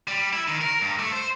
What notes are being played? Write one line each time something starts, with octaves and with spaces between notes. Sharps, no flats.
G3
E4
D#3
A#4
G2
A3
C5